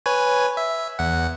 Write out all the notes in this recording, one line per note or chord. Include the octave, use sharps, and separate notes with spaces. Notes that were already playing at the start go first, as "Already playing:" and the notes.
B4 C#5 G#5
E5
E2 F#5